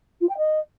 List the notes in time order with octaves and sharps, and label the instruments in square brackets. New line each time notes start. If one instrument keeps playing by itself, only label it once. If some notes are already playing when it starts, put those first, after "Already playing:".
[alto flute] F4
G5
D#5